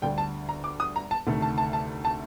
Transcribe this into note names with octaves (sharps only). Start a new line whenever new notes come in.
D2 D3 G3 G5
A5
A#5
D6
D#6
A#5
A5
D2 C3 D#3 A3
A5
A5
A5
A5